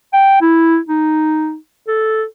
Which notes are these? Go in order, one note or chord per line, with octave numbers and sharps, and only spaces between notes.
G5
E4
D#4
A4